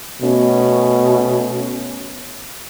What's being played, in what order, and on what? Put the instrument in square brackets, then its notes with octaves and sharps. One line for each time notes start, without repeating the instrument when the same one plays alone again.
[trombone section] B2 A3 C#4